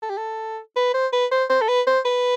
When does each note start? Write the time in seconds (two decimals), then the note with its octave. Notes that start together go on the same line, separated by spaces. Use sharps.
0.03 A4
0.10 G4
0.18 A4
0.76 B4
0.94 C5
1.13 B4
1.32 C5
1.50 C5
1.61 A4
1.69 B4
1.87 C5
2.05 B4